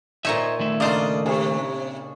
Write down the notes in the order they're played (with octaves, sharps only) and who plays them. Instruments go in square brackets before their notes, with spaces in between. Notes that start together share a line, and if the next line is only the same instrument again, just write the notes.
[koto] A#2 C#5 G#5 [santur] D#4 [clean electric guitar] C5 D#5 E5
[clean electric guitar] D#3 A3 E5
[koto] C#3 C5 [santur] A#3 A4 [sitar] D4 D5 D#5
[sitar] C3 [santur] G#4 C#5